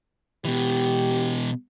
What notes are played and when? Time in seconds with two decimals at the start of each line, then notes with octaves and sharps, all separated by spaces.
0.45 B2 E3 G4